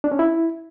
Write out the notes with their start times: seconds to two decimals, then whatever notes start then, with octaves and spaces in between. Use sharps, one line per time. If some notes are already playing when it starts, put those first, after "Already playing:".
0.04 D4
0.12 C#4
0.19 E4